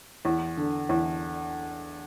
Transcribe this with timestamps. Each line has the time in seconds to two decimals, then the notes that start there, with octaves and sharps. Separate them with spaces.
0.25 E2
0.57 D3
0.89 E2